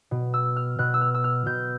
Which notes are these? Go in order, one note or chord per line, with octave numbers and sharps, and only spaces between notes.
B2
E6
F6
B2 F#6
E6
F6
E6
F6
B2 G6